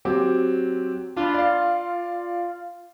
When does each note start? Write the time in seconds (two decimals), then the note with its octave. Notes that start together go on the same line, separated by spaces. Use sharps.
0.05 F#3 C4 G4
1.16 D4 F4 B5
1.34 D5 F5